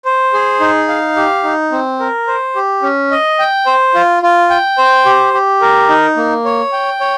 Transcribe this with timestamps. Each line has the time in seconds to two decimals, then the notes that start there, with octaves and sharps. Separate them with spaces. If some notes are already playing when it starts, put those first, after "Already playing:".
0.05 C5
0.33 G#4
0.60 D#4
0.88 F5
1.16 G4
1.44 D#4
1.72 C4
2.00 A#4
2.27 C5
2.55 G4
2.83 C#4
3.11 D#5
3.39 G5
3.66 C5
3.94 F4
4.23 F4
4.50 G5
4.78 C5
5.05 G4
5.34 G4
5.61 A#4
5.89 D#4
6.17 A#3
6.45 C#5
6.72 G5
7.01 C#5